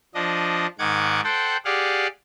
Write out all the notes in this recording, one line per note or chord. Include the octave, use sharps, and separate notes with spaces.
F3 D4 D#5
G#2 D#3 F#5 D6 G#6
A4 C5 F#5 G5
G4 G#4 D5 F5 F#5